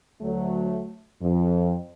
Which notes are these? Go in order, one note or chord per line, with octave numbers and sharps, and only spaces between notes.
D2 F#3 A3
F2